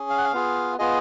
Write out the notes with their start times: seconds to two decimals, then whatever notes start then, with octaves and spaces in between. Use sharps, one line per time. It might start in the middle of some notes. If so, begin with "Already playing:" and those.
Already playing: C#4 G#4
0.10 F5
0.18 F#5
0.25 F5
0.33 B3 F4 G#4
0.79 B3 F4 G#4 D#5